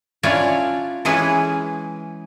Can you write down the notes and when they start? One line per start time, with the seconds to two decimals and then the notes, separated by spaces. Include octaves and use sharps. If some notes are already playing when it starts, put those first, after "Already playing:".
0.23 C#4 D4 E4 F4 C#5 D5
1.05 E3 G#3 C#4 E4 G#4 B4